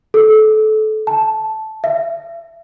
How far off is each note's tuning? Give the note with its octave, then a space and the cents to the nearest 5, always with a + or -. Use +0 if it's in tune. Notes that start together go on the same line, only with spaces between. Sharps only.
A4 -25
A5 -10
E5 +30